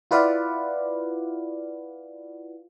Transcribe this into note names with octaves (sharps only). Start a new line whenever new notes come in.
E4 F4 B4 D5 F5 F#5